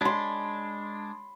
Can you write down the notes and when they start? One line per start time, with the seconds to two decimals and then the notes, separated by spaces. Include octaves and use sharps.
0.01 G#3 D4 B5 C6